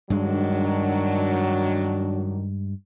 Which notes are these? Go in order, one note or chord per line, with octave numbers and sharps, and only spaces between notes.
G2 D#3 F#3 G#3 D4